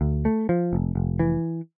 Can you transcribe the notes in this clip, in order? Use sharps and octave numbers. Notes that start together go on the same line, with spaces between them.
D2
A3
F3
F1
F1
E3